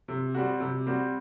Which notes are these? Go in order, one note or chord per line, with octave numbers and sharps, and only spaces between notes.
C3
G3 C4 F#4
C3
G3 C4 F#4